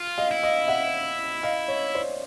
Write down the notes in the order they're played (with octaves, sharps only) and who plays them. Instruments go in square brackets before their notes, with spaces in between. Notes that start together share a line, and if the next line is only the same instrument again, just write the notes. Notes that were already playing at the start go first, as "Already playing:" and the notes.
Already playing: [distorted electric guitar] F4
[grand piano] D#5 F5
[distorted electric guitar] E4
[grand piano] D#5 F5
E5 F#5
D#5 F5
C#5 D#5
C5 D5